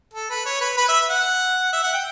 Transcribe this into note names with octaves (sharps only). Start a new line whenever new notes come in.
A4
B4
C#5
B4
B4
E5
F#5
E5
F#5
G5